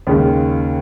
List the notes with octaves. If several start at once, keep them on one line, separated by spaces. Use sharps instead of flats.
D#2 C#3 G#3